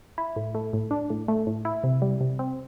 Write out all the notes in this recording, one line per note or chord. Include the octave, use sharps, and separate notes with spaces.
E4
A2
A3
A2
D4
A2
A3
A2
E4
C3
G3
C3
C4